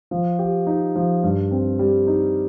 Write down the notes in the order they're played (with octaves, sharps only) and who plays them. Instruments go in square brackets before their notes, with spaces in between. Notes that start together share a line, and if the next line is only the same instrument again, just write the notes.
[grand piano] F3
G4
D#4
F3
G2
C4
G3
D#4